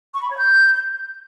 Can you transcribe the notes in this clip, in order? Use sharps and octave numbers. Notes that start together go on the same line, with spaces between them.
C#6
B5
C#5
G6